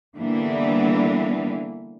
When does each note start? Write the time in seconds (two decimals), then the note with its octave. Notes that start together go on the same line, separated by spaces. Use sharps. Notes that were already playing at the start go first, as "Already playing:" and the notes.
0.17 D3 E3 G3 A#3 B3 D4